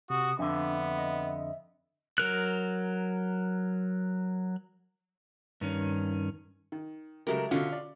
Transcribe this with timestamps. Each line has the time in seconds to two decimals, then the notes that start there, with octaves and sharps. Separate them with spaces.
0.10 C3 F#4 D#6
0.39 F2 D3 B3 D4 E5
0.99 D#5
2.18 F#3 A#4 F#6
5.61 G2 D#3 C#4
6.72 D#3
7.27 C#3 F#3 G#3 A3 G4 A#4
7.51 B2 D3 C#4 F4 F#4
7.72 D5